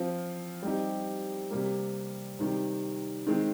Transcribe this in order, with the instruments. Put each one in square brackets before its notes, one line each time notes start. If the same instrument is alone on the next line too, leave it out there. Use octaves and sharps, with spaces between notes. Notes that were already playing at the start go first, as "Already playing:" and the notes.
Already playing: [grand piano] F3 C4 F4
G3 C4 D#4 G4
C3 G3 A#3
C3 D#3 G3
D#3 G#3 C4